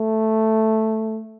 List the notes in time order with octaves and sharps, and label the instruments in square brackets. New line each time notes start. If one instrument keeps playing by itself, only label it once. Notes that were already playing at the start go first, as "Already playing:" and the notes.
Already playing: [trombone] A3